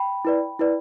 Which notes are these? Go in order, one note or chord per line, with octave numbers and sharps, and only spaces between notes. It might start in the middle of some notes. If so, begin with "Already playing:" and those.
Already playing: G5 B5
E4 B4 D5
E4 B4 D5